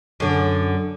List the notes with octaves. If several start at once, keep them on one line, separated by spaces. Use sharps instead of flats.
F#2 D3